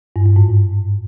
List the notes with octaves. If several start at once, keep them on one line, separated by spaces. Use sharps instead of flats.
G2
G2
G#2